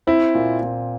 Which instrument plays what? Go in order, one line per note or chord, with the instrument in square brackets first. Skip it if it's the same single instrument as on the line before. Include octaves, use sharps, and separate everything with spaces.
[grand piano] C4 [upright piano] E4
[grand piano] A#2
A#2